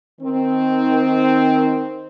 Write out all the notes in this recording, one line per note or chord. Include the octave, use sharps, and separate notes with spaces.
D#3 C4